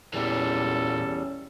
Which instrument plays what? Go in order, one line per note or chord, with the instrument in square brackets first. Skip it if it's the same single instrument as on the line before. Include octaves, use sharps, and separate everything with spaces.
[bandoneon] E2 G3 [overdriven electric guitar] A#2 E3 [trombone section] C#4 [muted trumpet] A4